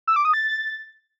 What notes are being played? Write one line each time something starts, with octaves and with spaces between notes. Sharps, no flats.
E6
D6
D#6
A6